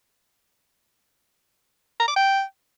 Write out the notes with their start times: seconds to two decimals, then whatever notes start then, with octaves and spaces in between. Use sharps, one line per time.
2.00 A#5
2.08 D6
2.16 G5